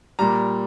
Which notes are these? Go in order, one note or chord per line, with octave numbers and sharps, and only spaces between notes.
A#2 G3 A#5